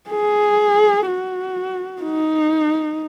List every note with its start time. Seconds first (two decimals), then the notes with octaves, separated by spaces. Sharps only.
0.10 G#4
1.07 F#4
2.02 D#4